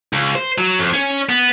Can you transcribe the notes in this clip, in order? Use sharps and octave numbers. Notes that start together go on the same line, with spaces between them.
C#2
C5
F#3
F2
C#4
B3